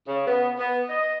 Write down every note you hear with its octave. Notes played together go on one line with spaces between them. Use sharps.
C#3
B3
B3
D#5